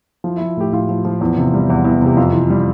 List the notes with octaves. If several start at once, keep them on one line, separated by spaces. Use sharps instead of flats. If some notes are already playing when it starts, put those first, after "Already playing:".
F3 E4
E4
F3
A2 G4
A2 F4
F3
F3
E2
C3
G3
E2 E4
E2
C3 G4
F2 F4
E3
G3